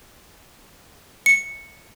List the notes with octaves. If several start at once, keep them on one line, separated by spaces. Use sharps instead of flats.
C#7